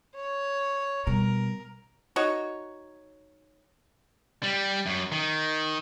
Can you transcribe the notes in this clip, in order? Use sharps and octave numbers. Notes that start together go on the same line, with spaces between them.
C#5
B2 G3 A#4
D#4 F#4 C#5
G3
F#2
D#3